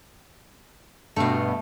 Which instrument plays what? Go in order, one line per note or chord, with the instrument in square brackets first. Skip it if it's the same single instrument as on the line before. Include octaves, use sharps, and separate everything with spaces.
[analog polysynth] G2 B2 [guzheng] A3 F5